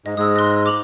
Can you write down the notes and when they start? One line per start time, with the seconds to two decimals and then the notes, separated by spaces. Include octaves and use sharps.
0.06 G#2 D#5
0.17 G#2 G#3 D#6 E6
0.36 C6 F#6 A#6
0.66 D6 F7 F#7